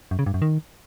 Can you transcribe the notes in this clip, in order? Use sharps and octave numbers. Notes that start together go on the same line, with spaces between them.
F#2
C#3
G2
F#2
D#3